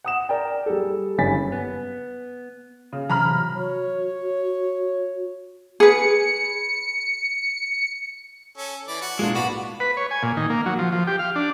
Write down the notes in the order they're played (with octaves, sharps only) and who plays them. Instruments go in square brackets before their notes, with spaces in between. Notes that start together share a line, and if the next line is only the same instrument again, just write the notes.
[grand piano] F#5 D#6 E7
A#4 D5 G5
G3 G#4 A4
F#1 G2 C#4 G#5 A6 B6
[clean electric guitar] B3
[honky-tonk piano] C#3
[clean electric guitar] C3 E3 F#3 [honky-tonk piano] A#5 B5 F6
[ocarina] F#4 [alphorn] C#5
[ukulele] G#4 B4 [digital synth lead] C#7
[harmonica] C#4 A4
E3 D5
F#4 F#5
[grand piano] B1 A2 F4 [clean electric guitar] G#3 A#3 D4
[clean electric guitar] B3 F#4 [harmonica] D5 B5
[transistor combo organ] B4
C#5
G#5
A#2
D#3
A#3
F#3
F3
F3
G4
F5
D4